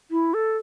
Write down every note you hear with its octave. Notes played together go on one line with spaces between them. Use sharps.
E4
A4